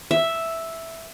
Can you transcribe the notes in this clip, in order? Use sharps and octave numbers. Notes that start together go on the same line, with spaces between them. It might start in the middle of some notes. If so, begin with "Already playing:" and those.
E5